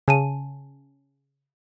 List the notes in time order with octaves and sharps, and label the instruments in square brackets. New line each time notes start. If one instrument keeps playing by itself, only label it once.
[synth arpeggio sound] C#3 [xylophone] G#5 A5 D#7